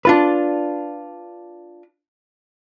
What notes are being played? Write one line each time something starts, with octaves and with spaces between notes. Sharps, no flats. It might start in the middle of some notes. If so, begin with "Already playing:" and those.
D4 F4 B4